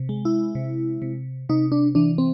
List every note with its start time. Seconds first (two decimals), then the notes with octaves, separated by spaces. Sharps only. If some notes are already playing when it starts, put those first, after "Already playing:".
Already playing: C3
0.09 G#3
0.25 E4
0.55 C3
1.02 C3
1.49 C3 D#4
1.72 D4
1.95 E3 D4
2.18 C4